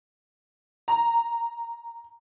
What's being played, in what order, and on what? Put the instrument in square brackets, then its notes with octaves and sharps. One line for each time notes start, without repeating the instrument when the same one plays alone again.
[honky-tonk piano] A#5